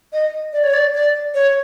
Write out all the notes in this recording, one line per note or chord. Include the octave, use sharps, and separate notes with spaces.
D#5
D5
C#5
D5
D5
C#5